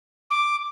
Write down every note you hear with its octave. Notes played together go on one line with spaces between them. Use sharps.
D6